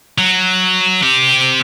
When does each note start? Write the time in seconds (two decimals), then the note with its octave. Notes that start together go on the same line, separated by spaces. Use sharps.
0.18 F#3
1.03 C4 G4